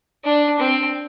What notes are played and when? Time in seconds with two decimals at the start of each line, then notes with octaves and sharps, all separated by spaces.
0.24 D4
0.59 C4